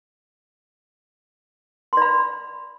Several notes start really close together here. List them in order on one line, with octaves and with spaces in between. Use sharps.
C6 D5 B5